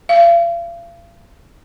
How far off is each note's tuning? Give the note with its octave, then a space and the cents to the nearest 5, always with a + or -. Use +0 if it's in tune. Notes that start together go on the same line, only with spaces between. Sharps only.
F5 -40